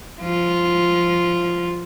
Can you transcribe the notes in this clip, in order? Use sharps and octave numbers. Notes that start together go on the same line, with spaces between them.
F3 F4